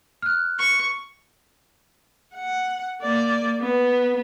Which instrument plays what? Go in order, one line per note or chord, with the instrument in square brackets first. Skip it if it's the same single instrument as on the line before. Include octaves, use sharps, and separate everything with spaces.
[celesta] F6 F#6
[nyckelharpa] C#6
[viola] F#5
A#3 D5
B3